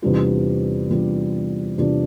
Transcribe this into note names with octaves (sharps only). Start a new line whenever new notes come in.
E2 C3 G3 D4 F4
E2 C3 G3 D4 F4
E2 C3 G3 D4 F4